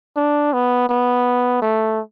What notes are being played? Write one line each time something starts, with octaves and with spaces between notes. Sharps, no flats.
D4
B3
B3
A3